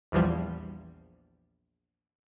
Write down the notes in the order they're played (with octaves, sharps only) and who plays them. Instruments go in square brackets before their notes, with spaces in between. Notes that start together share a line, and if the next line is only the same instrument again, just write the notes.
[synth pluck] A#1 E2 E3 F3 G3